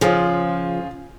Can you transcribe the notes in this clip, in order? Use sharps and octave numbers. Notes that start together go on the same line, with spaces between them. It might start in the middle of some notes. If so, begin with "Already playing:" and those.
C#3 F3 F4 G#4 C5